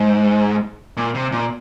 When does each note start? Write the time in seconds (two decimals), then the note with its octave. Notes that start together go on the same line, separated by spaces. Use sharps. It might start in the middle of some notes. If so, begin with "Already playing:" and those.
Already playing: G#2
0.97 A#2
1.15 C3
1.32 A#2